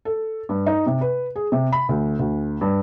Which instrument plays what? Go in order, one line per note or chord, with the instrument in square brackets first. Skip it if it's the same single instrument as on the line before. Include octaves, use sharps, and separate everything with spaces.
[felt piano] A4
G2
D#4
C3
B4
G#4
C3
B5
D2
D2
G2